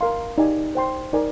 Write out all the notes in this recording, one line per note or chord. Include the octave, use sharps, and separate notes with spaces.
A#4 F5 C6
D#4 G4 D5 G#5
C5 G5 C6
D#4 A#4 D5 G#5